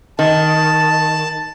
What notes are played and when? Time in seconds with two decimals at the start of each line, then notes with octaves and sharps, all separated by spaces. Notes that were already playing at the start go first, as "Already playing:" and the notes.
0.19 D#3 A5